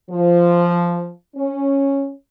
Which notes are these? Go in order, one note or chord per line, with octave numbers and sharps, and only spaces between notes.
F3
C#4